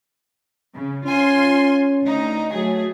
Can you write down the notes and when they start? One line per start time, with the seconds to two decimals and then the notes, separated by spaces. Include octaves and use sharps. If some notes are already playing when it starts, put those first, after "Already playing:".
0.75 C#3
1.06 C#4 F4 G#5 C6
2.03 D2 D#4
2.54 F#3 A3 G#4